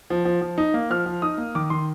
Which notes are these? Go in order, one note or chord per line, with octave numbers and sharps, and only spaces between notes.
F3
F3
F3
D#4
A#3
F3 F6
F3
D#4 D#6
A#3
D#3 D6
D#3 C6